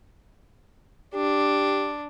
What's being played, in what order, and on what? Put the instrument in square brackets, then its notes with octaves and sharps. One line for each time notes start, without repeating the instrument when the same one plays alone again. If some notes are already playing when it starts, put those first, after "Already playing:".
[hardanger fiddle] D4 [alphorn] G4